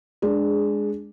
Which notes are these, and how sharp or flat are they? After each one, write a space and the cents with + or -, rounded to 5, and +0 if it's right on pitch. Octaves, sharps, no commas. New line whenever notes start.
G#3 +0 D4 +0 G#4 -10